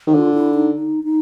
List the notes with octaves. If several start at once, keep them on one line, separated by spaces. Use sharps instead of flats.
D#3
D3 F4
E4
D#4
D#4
D#4